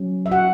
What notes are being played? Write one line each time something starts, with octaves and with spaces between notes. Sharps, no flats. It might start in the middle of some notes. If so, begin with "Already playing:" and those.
Already playing: F#3 C#4
E5
F#4 F#5